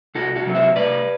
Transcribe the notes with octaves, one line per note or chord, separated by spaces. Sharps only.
C2 F#4 A4
F#4 A4
C3 F#3 C4
C5 E5
C2 B4 D5